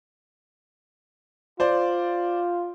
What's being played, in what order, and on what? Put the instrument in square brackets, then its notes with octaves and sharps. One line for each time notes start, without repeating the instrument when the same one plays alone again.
[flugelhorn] F4 [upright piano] C5 D5